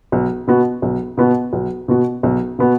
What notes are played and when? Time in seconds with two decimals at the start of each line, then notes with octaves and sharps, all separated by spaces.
0.12 B1
0.47 B2 B3 F#4
0.82 B1
1.17 B2 B3 F#4
1.53 B1
1.88 B2 B3 F#4
2.23 B1
2.59 B2 B3 F#4